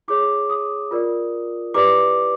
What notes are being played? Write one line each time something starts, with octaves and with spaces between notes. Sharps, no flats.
E4 G#4 C#5 D6
D#6
F4 A#4 D5
E4 G4 B4 D5 D6